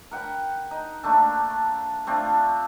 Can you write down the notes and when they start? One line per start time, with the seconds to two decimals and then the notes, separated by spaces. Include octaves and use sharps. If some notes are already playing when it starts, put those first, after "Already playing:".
0.11 A#4 F#5 G5 B5
0.71 D#4
1.03 A3 A#3 D4 A4
2.07 A3 C4 D4 F4